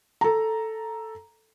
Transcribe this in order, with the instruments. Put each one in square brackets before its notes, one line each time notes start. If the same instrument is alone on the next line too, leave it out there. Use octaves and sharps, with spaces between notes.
[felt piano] A4 A#5